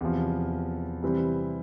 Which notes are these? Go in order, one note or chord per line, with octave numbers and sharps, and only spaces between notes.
E2 C3 F3
C3 E3 G3 C4